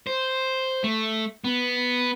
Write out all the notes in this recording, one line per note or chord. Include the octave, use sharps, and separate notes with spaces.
C5
A3
B3